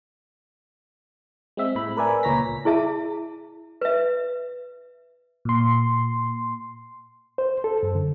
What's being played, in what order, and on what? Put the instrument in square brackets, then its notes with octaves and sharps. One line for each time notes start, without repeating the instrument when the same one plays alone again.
[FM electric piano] G#3 C4 E5
A2 B5
A#4 B4 D5 E5 G#5
C#2 A#2 C#5 A#5 A#6 B6
[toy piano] E4 G#4 E5 A5
B4 E5
[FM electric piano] A#2 C6
[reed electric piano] C5
A4
F#2
D3